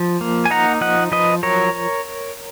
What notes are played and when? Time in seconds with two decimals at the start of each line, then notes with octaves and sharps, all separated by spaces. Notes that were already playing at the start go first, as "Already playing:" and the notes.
Already playing: F3
0.21 A#3
0.45 G#5
0.50 D#4 F#5 A#5
0.81 F3 D#5 F#5
1.12 F3 B4 D#5
1.43 F#3 A#4 C#5